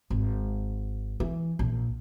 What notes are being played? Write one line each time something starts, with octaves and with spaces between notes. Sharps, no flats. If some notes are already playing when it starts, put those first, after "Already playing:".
G#1
E3
A#1